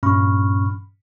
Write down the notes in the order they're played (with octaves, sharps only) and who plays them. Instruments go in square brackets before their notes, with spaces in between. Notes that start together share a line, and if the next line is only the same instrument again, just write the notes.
[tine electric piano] G2 A#2 C#4 B5 C#6 F6